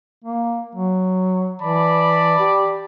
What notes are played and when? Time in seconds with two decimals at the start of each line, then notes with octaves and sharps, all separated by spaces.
0.24 A#3
0.75 F#3
1.61 E3 D5 A5 B5
2.39 G4